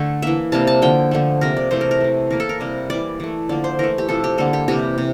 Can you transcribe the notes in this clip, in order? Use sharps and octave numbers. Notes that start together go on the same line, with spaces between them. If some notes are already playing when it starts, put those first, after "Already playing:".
Already playing: D3 A3
E3 A#3 E5
C3 G3 A#3 A5
A5
D3 F3 A#3 G5
D3 F3 A3
C3 F3 A#3 A#4
D5
C3 E3 A3 C5
A#4
A#4
E3 A3
E3 A#3 A#4
A4
A#4
C3 G3 A#3
E3 A#3 D5
E3 A3
D3 F3 A#3 D5
C5
E3 A3 A#4
G4
C3 F3 A3 A4
G4
D3 G3 A#3 A4
G4
C3 E3 A#3 G4
C3